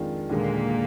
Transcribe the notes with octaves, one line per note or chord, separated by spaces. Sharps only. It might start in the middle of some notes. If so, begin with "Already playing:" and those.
Already playing: F2 D#3 G#3 D4 F4
D#2 A#2 D3 G#3 A#3